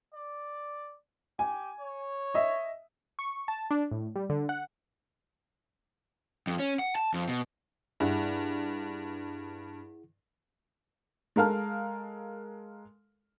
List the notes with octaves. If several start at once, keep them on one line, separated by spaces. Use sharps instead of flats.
D5
G4 G#5
C#5
D#5 E5
C#6
A5
D4
A2
G3
D3
F#5
F2
C#4
F#5
A5
F2
B2
G2 E4 G#4 F#5
G#3 A4 A#4 F5 A5 F6